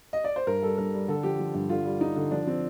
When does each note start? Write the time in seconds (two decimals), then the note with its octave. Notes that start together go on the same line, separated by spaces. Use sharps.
0.13 D#5
0.24 D5
0.36 C5
0.47 G2 A#4
0.62 G3 A4
0.78 G2 A#4
0.94 G3
1.08 D3 A4
1.23 F3 G4
1.39 F3
1.54 G2
1.69 D3 F4
1.85 G3
2.01 G3 D#4
2.16 D3
2.31 F3 D4
2.47 F3 C4